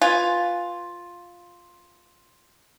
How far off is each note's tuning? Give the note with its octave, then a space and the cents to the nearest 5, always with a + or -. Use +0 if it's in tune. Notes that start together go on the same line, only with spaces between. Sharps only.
F4 +5 B4 +0 G#5 +0